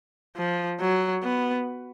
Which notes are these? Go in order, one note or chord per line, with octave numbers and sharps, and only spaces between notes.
F3
F#3
B3